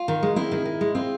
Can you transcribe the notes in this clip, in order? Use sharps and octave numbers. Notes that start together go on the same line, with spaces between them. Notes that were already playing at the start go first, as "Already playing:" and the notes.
Already playing: F4
D#3
G#3
C4 E4
D#3
D#3
G#3
C4 F4